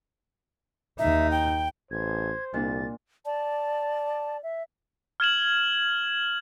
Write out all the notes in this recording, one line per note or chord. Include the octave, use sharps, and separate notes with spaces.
D#2 D#4 E5
G5
A1 C5 G#6
C2 A#2 D4 A6
D5 A5
E5
F6 G#6 E7 F#7